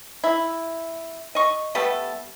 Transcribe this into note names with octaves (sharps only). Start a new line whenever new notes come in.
E4
D#5 C#6
G3 A3 B3 A4